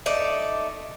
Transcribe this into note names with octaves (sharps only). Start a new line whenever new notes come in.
A3 D#4 D5